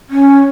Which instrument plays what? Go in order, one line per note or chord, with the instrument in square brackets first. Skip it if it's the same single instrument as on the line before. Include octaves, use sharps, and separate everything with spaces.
[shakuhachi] C#4